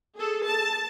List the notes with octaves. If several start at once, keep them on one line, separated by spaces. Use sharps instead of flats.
G#4 A4
A5